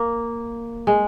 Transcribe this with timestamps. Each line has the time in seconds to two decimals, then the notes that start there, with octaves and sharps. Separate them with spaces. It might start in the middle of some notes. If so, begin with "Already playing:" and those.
Already playing: A#3
0.87 G#3